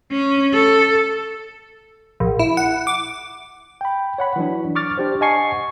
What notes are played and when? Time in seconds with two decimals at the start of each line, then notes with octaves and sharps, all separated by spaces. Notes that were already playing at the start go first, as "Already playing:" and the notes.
0.12 C#4
0.53 A4
2.20 A#1
2.39 E4
2.57 F#5
2.87 D6
3.81 G5 B5
4.18 C#5 F#5 B5
4.36 E3 F#3 D4
4.75 C#6 D6 F6 A6
4.98 D4 G4 C5
5.21 D#5 F#5 G#5 A5 C#6 C7